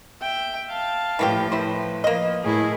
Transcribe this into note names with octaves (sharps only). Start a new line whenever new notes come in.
E5 G5
F5 A5
A2 E3 F3 A#3 G4
E4 B4 C5
F3 A#3 D#5
A2 E4 G#4 A#4